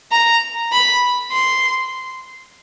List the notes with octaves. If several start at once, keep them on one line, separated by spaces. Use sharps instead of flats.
A#5
B5
C6